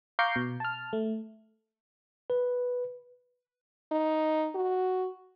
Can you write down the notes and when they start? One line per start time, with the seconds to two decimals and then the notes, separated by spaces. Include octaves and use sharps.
0.19 F5 A#5 C#6 D6 G6 C7
0.36 B2
0.60 A5 F6
0.93 A3
2.30 B4
3.92 D#4
4.55 F#4